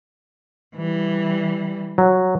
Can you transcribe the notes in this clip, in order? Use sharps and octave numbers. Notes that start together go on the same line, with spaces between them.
E3 G3
F#3